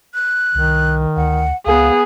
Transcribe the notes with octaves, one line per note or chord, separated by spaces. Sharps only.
F#6
C2 D#3
D2 F#5
C#2 B3 G#4 F5